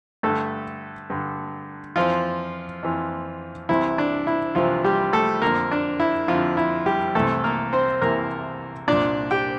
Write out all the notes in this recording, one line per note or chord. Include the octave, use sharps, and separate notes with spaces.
G2 D3 A3 A4
G2 D3
F2 E3 F3 F4
F2 E3
C2 C3 E3 E4
D4
E4
C2 C3 E3 F3 F4
G3 G4
A3 A4
F2 D3 A#3 A#4
D4
E4
F2 D3 F3 F4
E4
G3 G4
C2 C3 E3 A3 A4
A#3 A#4
C4 C5
C2 C3 E3 A#3 A#4
C2 A#2 D4 D5
G4 G5